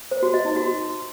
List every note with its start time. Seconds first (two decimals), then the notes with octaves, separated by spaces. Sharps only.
0.11 C5
0.23 F#4
0.34 D#5
0.45 D#4
0.56 F#4